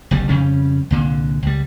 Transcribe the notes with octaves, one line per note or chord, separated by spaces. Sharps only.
F#1 C2 G3
F2 C#3 G3 C#4
C2 A#2 D3
C#2 G3